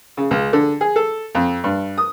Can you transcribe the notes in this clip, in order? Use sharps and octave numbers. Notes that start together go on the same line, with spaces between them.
C#3
C#2
D3
G#4
A4
F2
G2
D#6